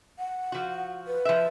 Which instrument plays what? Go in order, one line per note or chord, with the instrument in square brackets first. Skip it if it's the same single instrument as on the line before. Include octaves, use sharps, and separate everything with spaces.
[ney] F#5
[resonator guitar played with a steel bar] F3 F#4
[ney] B4
[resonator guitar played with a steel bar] F3 E5